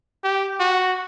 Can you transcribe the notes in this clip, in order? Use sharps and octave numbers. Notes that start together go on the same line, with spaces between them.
G4
F#4